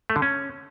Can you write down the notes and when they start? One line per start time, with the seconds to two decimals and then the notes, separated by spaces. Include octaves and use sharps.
0.10 A3
0.16 D3
0.22 C#4